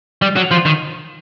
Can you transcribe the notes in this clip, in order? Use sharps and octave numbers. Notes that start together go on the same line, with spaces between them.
G3
F#3
F3
D#3